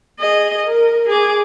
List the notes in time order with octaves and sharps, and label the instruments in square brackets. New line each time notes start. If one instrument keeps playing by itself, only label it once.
[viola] G#4 D#5
A#4
G#4 D6